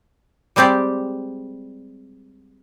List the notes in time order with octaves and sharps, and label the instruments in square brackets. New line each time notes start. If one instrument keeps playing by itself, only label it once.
[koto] G3 G#3 C4 G4 D5